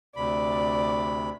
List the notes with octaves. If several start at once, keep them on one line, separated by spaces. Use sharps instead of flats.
D2 C3 D5 B5